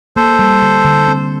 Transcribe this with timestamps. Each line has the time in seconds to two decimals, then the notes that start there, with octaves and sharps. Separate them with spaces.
0.16 A#3 A4 C5
0.39 G3
0.62 D3
0.85 D3
1.08 C4